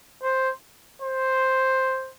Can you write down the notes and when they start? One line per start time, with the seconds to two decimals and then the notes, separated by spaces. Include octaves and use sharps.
0.23 C5
1.02 C5